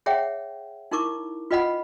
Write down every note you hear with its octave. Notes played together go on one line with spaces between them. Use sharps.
G#4 C#5 E5 F#5 G5
D#4 E4 A#4 C#6 D6
F4 B4 D#5 F5 F#5 B5